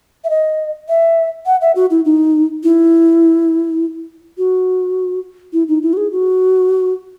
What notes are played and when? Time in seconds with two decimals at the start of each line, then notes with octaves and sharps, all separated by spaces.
0.24 E5
0.30 D#5
0.89 E5
1.46 F#5
1.61 E5
1.76 F#4
1.91 E4
2.05 D#4
2.63 E4
4.38 F#4
5.53 E4
5.68 D#4
5.82 E4
5.93 F#4
5.97 G#4
6.12 F#4